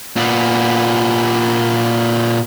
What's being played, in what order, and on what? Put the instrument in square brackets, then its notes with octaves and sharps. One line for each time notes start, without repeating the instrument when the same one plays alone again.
[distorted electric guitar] A#2 B3